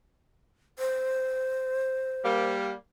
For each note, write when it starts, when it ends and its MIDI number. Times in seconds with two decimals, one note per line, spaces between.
0.79 2.51 72
2.24 2.71 55
2.24 2.71 58